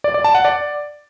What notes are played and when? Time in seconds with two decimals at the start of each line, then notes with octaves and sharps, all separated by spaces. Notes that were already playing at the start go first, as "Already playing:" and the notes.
0.04 D5
0.14 D5
0.24 A5
0.35 F#5
0.45 D5